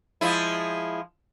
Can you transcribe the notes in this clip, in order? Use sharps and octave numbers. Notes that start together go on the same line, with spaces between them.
F3 G#3 E4